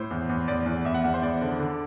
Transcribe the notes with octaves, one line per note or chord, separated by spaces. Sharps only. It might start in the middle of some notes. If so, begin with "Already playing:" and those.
Already playing: A2 C5
E2
E2
E2 D5
E2
E2 E5
F#5
E2 E5
C5
E2 D5
D3
D3